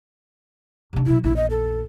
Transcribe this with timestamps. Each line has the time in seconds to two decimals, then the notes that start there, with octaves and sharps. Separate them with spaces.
0.93 C3 D4
1.06 B2 F#3 E4
1.24 A#1 E2 E4
1.36 D#5
1.50 A4